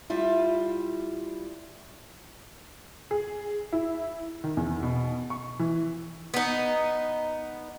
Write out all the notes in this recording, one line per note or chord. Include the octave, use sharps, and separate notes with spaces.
G3 E4 F4
G#4
E4
D#3
E2
B2
C#6
E3
B3 D#4